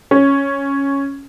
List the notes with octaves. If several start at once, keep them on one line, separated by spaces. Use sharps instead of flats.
C#4